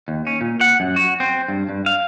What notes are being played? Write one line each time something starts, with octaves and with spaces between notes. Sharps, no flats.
D#2
C#4
A#2
F#5
F#2
F#4
C4
G2
G2
F5